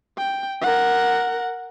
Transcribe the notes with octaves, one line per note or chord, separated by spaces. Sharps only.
G5
A#4 F#5